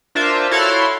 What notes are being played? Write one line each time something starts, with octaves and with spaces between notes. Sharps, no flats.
D4 F4 A#4 C5 E5
E4 F#4 A4 C#5 F5 C6